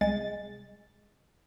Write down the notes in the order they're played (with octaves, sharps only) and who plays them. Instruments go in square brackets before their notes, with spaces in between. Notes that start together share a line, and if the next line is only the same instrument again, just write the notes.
[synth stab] C2 G#3 A6